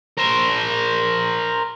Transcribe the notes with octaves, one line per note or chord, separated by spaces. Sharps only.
A#4 C5